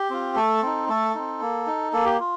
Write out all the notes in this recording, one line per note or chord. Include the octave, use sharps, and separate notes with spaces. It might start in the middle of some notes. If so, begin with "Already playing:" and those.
Already playing: G4
C4 F4
A3 A4
C4 D#4
A3 A4
C4 D#4
A#3
D#4
A#3 A4
G4
F4